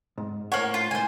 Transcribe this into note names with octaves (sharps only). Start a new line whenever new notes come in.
G#2
A2 A#3 C5 C#5 F#5
F4
C#2 A2 D#3 C5 G#5